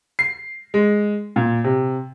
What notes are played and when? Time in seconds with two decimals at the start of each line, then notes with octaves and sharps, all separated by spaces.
0.19 C7
0.74 G#3
1.36 A#2
1.64 C3